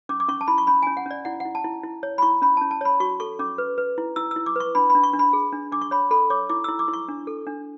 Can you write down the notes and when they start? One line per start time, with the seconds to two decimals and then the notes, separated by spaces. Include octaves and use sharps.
0.09 C#4 D6
0.20 D6
0.28 C#4 C#6
0.41 A5
0.48 E4 B5
0.58 C#6
0.67 C#4 B5
0.82 C#4 G#5
0.97 F#5
1.06 C#4 D5
1.25 E4 F#5
1.40 F#5
1.45 E4
1.55 A5
1.64 E4
1.84 E4
2.03 C#5
2.18 B5
2.22 E4 C#6
2.42 C#4 B5
2.57 C#4 A5
2.71 A5
2.81 C#5 B5
3.00 F#4 C#6
3.20 A4 C#6
3.39 C#4 D6
3.58 B4
3.78 B4
3.98 E4
4.16 E4 E6
4.31 E6
4.36 E4
4.46 D6
4.56 B4 C#6
4.75 D4 B5
4.90 B5
4.95 D4
5.03 C#6
5.13 D4
5.19 B5
5.33 G#4
5.52 D4
5.72 D4 D6
5.81 C#6
5.91 C#5 B5
6.11 A4 B5
6.30 C#5 D6
6.50 E4 D6
6.64 E4 E6
6.79 D6
6.88 E4
6.93 C#6
7.08 D4
7.27 A4
7.47 D4